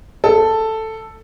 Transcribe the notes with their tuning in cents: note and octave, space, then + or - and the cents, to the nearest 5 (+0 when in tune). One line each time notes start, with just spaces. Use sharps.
A4 +5